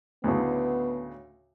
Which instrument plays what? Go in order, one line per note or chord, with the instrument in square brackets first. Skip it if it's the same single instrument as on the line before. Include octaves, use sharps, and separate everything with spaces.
[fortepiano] D2 A2 C#3 [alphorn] B3